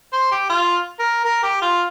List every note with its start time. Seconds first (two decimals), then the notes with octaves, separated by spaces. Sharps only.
0.13 C5
0.31 G4
0.50 F4
0.99 A#4
1.25 A#4
1.43 G4
1.62 F4